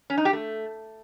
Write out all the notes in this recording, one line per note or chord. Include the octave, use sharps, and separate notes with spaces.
C#4
D#4
G4
A3